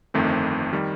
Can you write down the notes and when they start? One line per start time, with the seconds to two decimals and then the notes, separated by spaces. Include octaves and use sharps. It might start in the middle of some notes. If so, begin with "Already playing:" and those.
0.14 G1 F2 D#3 A3 C4
0.73 D#3 G3